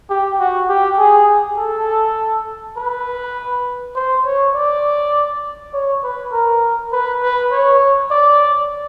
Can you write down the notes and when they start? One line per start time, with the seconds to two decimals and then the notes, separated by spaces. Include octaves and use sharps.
0.10 G4
0.40 F#4
0.69 G4
0.99 G#4
1.58 A4
2.77 B4
3.95 C5
4.25 C#5
4.55 D5
5.74 C#5
6.03 B4
6.33 A#4
6.92 B4
7.22 B4
7.52 C#5
8.11 D5